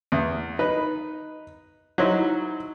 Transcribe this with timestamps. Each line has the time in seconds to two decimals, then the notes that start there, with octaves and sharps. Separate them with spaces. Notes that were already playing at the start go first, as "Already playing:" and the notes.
0.12 E2
0.59 D#4 B4
1.98 F#3 D#4 E4 C5